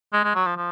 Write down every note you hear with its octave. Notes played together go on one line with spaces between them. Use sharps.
G#3
G#3
F#3
F3
F3